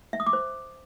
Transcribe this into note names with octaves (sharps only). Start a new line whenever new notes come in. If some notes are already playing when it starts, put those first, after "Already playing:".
E5
D#6
D6
C5